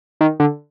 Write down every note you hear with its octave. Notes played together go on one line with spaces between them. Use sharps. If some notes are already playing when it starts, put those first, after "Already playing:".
D#3
D3